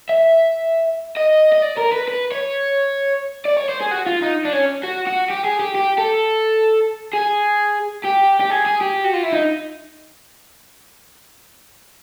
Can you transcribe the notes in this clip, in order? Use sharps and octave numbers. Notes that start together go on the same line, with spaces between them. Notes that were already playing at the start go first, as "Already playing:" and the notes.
E5
D#5
D#5
D5
A#4
B4
B4
C#5
D5
C#5
C5
G#4
F#4
F4
D#4
D4
C#4
F#4
F#4
G4
G#4
G4
G4
A4
G#4
G4
G4
G#4
G#4
G4
F#4
F4
E4
D#4